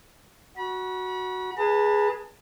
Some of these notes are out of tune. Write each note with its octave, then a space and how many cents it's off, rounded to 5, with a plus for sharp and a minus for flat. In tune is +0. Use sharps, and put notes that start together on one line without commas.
F#4 +0 B5 -40
G#4 +0 B4 -20 A5 +35